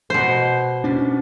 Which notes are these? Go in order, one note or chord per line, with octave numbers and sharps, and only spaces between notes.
B2 C5
C#4 D4